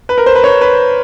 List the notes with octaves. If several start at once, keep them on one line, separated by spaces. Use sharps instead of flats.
B4
A#4
C5
B4
C#5
B4